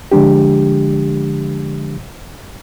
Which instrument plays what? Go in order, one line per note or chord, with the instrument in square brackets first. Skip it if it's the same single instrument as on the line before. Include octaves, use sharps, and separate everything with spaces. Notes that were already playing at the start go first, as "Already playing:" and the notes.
[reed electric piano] D3 F3 G#3 D4 G4